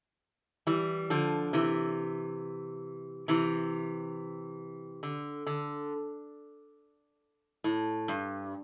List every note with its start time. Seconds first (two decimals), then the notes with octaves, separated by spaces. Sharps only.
0.67 E3 G3
1.10 D3 F3
1.53 C3 E3
3.28 C3 E3
5.03 D3
5.46 D3
7.64 A2
8.08 G2